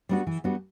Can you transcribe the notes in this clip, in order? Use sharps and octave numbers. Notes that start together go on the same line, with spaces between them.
G3 B3 D4 F#4
E3
G3 B3 D4 F#4